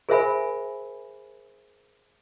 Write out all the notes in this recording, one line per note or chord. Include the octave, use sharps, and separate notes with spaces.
G#4 A#4 C5 E5 G#5 B5